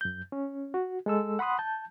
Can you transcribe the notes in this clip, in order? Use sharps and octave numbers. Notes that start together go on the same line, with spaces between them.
F#2 G6
C#4
F#4
G#3 A4 E6
F#5 B5 C6 D#6 F#6
A5 G6